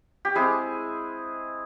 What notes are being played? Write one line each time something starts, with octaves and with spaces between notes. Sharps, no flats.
G4
G#3 C4 E4 G#4